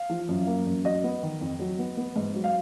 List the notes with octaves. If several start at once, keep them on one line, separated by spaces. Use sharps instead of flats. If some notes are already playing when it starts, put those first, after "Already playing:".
Already playing: F5
F3
F#2
A#3
F#2
F#3 D#5
B3
D#3
F2
F#3
B3
B3
G#2
F#3
F5